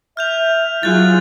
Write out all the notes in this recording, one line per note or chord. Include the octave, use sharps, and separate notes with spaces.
E5 F6 G6 F7
F#3 F4 G#4 F#6 A6